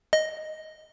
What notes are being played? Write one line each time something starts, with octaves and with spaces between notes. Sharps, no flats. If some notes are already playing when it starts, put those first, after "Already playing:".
D#5